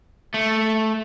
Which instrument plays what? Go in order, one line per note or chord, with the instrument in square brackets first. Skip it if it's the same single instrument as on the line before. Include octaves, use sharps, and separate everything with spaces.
[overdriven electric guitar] A3